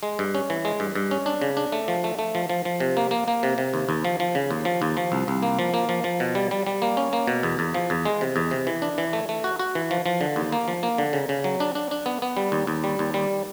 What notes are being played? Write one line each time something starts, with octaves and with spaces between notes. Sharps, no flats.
G#3
G2
C#4
E3
G#3
G2
G2
C#4
D4
C#3
D4
A3
F3
A3
A3
F3
F3
F3
C3
A#3
A#3
A#3
C3
C3
D#2
D#2
F3
F3
C#3
D#2
F3
D#2
F3
C2
C2
A#3
F3
A#3
F3
F3
B2
G3
G3
G3
A#3
C#4
A#3
B2
E2
E2
F3
E2
G#3
C3
E2
C3
E3
D4
E3
A3
A3
F#4
F#4
E3
F3
F3
D3
D#2
A#3
F3
A#3
D3
C#3
C#3
F#3
D4
D4
D4
B3
B3
G3
D#2
D#2
G3
D#2
G3